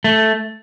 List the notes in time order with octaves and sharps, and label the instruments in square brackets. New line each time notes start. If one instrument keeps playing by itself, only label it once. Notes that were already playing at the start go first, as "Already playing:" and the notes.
[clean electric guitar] A3